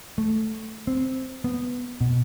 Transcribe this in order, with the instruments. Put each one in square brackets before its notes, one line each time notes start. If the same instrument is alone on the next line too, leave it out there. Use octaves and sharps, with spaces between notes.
[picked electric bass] A3
C4
B3
B2